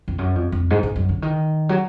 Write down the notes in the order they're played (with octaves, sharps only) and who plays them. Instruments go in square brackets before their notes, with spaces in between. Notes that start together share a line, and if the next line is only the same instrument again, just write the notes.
[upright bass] F2
F#2
F2
F2
G#2
G#2
F#2
D3
D#3
F#3